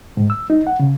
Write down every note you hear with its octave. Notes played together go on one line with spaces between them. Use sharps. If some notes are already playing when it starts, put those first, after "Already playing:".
G#2
E6
D#4
F#5
C#3